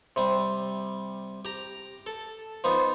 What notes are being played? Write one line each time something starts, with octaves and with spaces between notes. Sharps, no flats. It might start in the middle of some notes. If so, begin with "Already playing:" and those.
C3 G3
G4 A#5
A4
F3 B3 D#4